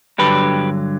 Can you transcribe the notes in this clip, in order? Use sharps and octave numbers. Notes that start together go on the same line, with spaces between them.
G2 D3 F#3 G4 B4